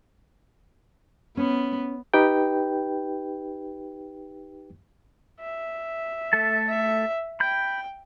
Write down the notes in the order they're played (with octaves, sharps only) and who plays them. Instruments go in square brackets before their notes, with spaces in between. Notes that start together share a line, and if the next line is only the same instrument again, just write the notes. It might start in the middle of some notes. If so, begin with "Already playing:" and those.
[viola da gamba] B3 [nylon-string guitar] C#4
[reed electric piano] D#4 G4 B4 G5
[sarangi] E5
[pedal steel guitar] A3 A4 A5
[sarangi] E5
[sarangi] G5 [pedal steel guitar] B5 G6